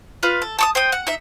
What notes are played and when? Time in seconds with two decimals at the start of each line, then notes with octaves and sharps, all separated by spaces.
0.23 F4 B4 F5
0.42 A4
0.59 A5 C#6 D#6
0.75 C5 G5 D#6
0.92 F#5
1.07 D#4 E5